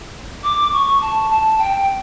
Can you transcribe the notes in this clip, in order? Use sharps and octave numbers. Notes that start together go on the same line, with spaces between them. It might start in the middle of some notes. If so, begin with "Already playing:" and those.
D6
C#6
A5
A5
G5